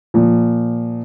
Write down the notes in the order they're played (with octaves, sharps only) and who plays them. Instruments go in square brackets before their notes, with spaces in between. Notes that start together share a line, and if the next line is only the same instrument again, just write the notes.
[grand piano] A#2 F3